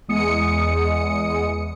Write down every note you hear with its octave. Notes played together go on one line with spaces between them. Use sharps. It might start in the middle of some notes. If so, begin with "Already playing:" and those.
E2 G#3 D#6 C#7